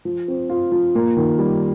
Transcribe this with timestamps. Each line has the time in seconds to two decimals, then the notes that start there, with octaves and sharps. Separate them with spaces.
0.05 F3
0.28 C4
0.50 F4
0.72 F3
0.95 A#3
1.17 D#3
1.39 G3